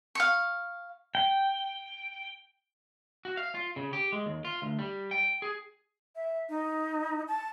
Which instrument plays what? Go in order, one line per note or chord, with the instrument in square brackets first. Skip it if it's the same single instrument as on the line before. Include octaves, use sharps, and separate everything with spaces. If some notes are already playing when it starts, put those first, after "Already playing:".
[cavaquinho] F5 C#6
[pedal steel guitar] G5
[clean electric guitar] F#4
F5
F4
C#3
G4
G#3
D#2
F4
D2
G3
G5
G#4
[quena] E5
D#4
A5